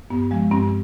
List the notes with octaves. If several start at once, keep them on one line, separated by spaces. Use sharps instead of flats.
G2 B3
F3 G#3
G2 C4